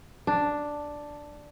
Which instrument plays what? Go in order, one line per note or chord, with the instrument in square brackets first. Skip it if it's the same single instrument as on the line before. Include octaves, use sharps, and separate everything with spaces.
[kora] D4